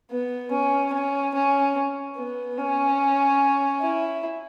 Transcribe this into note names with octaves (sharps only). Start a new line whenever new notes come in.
B3
C#4
C#4
C#4
B3
C#4
E4